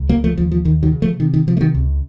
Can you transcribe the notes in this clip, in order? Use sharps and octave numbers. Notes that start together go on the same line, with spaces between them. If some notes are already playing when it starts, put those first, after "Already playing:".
Already playing: C#2
C#3 F#3 A#3
F3 A3
D#2 F3
F3
D#2 D#3
D#3 F#3
C#3
F3 A3
C3 D#3
D#3
C3 F3
A3
D#3 F#3
C#2